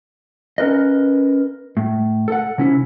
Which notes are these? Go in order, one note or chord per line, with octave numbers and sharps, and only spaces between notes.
C#4 A#4 B4 D#5
A2
A4 F#5
C3 C#4 E4